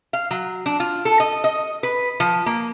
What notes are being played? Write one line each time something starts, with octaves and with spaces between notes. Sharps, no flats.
F5
F#3
D4
F4
A4
D#5
D#5
B4
F3
A#3